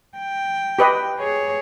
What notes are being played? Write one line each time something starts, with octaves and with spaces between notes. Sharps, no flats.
G5
G4 B4 D#5
G#4 C#5